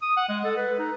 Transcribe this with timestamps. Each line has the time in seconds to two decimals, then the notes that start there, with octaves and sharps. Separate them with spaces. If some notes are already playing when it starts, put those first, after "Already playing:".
0.02 D#6
0.17 F#5
0.29 G#3
0.45 A4
0.57 B4
0.79 D#4